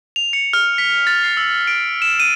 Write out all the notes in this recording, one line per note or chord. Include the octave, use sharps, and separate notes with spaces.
F7
C#7
F6
B6
A6
C7
E6
D7
E7
D#7